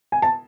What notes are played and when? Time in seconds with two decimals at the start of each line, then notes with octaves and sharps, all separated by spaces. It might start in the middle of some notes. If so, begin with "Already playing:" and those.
0.12 G#5
0.22 A5